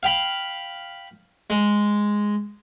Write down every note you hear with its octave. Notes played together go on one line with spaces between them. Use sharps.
F5 G5 B5
G#3